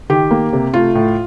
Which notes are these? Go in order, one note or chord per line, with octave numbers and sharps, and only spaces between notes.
D#3 G4
A#3
C3
A3 F4
A2